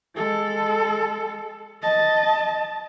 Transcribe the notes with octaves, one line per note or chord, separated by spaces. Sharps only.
G#3 A4
D#5 A5